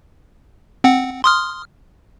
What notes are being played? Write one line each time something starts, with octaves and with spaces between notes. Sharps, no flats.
C4 F#5
C6 D#6 F6